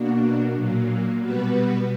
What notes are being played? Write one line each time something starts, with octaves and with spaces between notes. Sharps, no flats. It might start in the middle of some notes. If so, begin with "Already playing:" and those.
Already playing: B2 A#3 D4 F#4
A#2 F#3 A#3
B2 G3 B3 F#4 B4